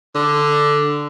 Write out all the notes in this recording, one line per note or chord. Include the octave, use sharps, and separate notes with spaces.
D3